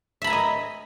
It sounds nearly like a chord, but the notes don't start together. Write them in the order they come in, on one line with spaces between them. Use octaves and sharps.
E5 B5 A#5 G#5 D#5